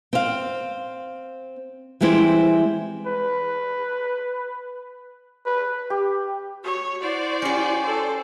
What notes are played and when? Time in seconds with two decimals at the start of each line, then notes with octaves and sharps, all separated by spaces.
0.13 C4 F5
2.01 E3 G3 G#3 C4 E4
3.07 B4
5.46 B4
5.90 G4
6.64 F#4 C#5
7.02 E4 F#4 C5 D5
7.42 C#4 G4
7.82 A4 C5